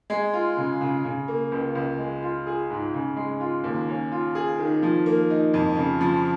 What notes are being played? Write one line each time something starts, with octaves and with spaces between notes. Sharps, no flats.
G#3
F4
C#3
C#3
C#3
A#3
C#2
C#2
G#3
F4
G#4
G#2
C#3
G#3
F4
D#2
C#4
F4
G#4
D#3
F3
A#3
D#4
F2
C#3
F3